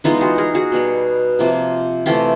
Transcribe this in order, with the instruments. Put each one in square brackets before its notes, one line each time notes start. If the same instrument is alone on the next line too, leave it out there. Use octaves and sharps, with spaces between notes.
[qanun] E3 G#3 B3 D#4 F4
F#4 G#4
G#4 A#4
F#4 G#4
B2 G3 B3
C3 F3 A#3
C3 E3 A3 F4 G4